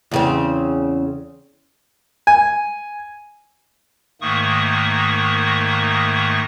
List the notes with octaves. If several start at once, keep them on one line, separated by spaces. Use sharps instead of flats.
E2 C#3 C4
G#5
G#2 D#3 A3 A#3 C#6 D#6